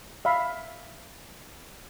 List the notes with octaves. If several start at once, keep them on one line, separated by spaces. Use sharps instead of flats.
E5 F5 B5